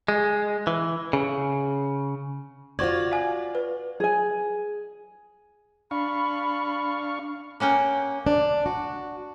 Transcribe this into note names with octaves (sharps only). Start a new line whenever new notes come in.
G#3
E3
C#3
F4 F#4 C5 D5 C#6 G#6
F5 G#5
B4
G#4 G#5
D4 F5 B5 C#6
A#3 C#4 F#5 G5
D4
F#4